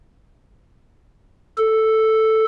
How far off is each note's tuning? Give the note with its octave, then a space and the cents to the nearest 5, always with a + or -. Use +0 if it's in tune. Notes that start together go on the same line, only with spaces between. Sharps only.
A4 +0